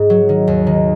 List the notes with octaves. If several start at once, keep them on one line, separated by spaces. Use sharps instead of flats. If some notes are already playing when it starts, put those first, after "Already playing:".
Already playing: G#2
F#3
D#3
D#2
D#3